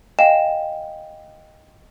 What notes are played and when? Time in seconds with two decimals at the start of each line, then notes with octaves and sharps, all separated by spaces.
0.19 D#5 F5 G5 G#5 E7